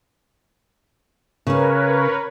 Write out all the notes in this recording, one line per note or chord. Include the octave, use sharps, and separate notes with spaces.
C#3 C#4 A#4 B4 C#5